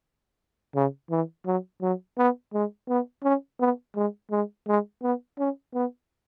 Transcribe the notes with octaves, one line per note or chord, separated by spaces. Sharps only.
C#3
E3
F#3
F#3
B3
G#3
B3
C#4
B3
G#3
G#3
G#3
B3
C#4
B3